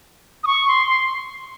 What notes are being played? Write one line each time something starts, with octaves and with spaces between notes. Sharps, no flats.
D#6
C#6
C6
C6